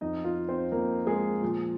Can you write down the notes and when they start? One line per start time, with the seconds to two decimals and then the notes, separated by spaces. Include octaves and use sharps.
0.01 F2 F3 D#4 D#5
0.24 F4 F5
0.49 C4 C5
0.71 F2 F3 A#3 A#4
1.07 G#3 G#4
1.42 A#2 F3